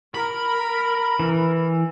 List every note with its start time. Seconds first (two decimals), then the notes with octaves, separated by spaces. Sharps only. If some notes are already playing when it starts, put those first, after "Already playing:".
0.15 A#4 B5
1.20 E3